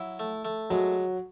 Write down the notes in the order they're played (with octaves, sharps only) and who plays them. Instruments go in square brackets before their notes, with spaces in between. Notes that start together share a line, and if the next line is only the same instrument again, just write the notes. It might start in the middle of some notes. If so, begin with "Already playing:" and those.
Already playing: [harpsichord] F#3 E4
A3
A3
[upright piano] F#3 [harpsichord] G#3